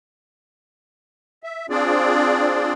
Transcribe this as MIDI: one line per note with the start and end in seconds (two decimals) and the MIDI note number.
1.43 1.66 76
1.70 2.73 60
1.70 2.73 62
1.70 2.73 65
1.70 2.73 68
1.70 2.73 74